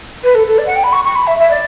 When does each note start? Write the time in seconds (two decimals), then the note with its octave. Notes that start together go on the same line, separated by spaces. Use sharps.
0.23 B4
0.35 A4
0.47 A4
0.58 D5
0.66 F#5
0.75 G5
0.83 B5
0.92 C#6
1.04 C#6
1.15 B5
1.27 E5
1.38 E5
1.50 D5